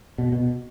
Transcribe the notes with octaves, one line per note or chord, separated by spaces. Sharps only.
B2
B2